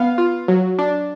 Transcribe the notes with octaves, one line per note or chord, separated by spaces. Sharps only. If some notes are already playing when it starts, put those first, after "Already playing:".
Already playing: B3 F5
F4
F#3
D4